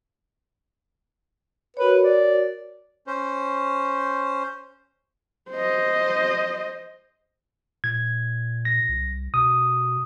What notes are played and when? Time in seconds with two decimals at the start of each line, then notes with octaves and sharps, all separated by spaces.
1.77 F#4 A#4 B4 C#5
2.03 D5
3.07 C#4 C5
5.51 C5 D#5
7.84 A#2 G#6
8.65 A#6
8.89 C2
9.34 B2 D#6